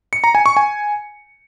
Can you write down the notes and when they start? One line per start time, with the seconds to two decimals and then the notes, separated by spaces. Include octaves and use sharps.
0.13 C#7
0.24 A#5
0.35 G#5
0.46 C#6
0.57 G#5